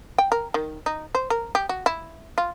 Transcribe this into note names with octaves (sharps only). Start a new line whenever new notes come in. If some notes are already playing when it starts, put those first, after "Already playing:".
G5
A#4
D#3
D#4
C5
A#4
G4
F#4
E4
F4